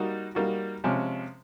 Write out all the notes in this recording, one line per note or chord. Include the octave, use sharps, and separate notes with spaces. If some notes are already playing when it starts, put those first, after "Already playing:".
Already playing: G3 A#3 D#4 F#4
G3 A#3 D#4 F#4
C3 F3 G#3 C#4